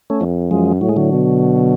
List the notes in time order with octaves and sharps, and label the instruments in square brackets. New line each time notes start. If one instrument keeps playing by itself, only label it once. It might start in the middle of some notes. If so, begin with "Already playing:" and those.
[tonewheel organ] A3 C#4
[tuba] F2
[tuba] F#2 [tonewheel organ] F3 G#3
[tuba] A2 [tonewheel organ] F#3
[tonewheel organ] G#3
D3 F#3
[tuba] B2